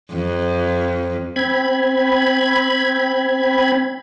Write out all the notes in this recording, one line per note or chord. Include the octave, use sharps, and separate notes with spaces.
F2
C4 B5 G#6